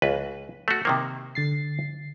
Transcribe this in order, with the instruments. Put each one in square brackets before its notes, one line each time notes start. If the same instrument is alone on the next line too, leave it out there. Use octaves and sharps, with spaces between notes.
[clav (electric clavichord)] C#2 B4
A3 F#4
C3 D#3 A#3
[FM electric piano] D3 A6 C7